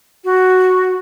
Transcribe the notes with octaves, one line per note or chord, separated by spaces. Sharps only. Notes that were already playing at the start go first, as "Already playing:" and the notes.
F#4